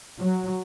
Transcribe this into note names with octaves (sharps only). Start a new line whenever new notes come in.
F#3